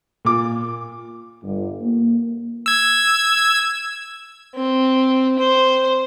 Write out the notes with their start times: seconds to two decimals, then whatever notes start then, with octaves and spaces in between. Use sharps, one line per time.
0.25 A#2 D6
1.43 G1
1.81 A#3
2.66 E6 G#6
4.55 C4
5.39 C5